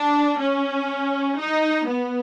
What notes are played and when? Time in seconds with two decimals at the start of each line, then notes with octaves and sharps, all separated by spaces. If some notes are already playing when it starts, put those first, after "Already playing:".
Already playing: D4
0.40 C#4
1.39 D#4
1.87 B3